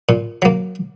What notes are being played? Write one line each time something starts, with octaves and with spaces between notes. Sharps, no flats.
A#2
F#3 A#3